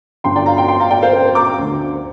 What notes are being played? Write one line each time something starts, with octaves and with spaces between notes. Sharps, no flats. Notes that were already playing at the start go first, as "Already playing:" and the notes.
G1 G2 D3 G5 C6
D5 G5
F5 A#5
G5 C6
G5 C6
F5 A#5
D5 G5
C5 F5
C5
C5
A#5 D6
D2 D3